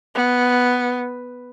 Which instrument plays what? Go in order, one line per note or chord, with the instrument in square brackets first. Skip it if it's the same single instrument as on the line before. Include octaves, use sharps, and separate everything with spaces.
[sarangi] B3